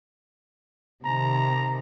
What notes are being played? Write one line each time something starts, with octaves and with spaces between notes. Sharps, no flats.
C3 D#3 A#5